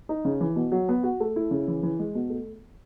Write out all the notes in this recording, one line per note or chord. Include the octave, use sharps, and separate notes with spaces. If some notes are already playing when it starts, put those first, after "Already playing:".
D#4
C#3
E3
B2
F#3
B3
F#4
A3
E4
C#3
E3
E3
G#3
B2
A3